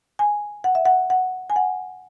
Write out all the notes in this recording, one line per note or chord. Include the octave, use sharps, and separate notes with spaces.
G#5
F#5
E5
F#5
F#5
G#5
F#5